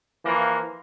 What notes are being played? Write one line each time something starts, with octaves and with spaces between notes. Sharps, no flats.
E3 F3 A#3